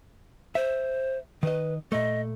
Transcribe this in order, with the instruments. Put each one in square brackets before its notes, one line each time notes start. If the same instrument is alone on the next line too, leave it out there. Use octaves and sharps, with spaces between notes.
[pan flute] C5 [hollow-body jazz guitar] E5
[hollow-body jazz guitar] D#3 D#5 [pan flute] B4
[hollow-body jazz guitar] A#2 A3 [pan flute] D#5